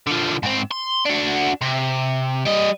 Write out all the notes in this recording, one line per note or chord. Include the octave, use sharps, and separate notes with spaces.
D3 F3
G#2 C4
C6
D4 F#4
C3
G3 D#5